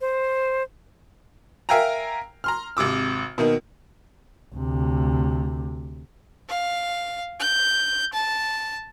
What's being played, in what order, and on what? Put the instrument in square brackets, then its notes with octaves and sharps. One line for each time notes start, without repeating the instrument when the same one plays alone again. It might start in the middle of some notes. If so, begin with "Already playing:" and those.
[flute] C5
[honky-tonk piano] A#4 E5 F5 G5 G#5 A#5
A#5 C6 F6
G#1 C3 D6 E6
B2 D#3 A#3 D#4
[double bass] D2 C3
[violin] F5
G6
A5